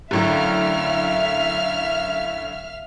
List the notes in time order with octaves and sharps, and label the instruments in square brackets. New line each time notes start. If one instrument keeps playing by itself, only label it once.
[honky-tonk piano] F#2 A2 D3 [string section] E5 F5 F6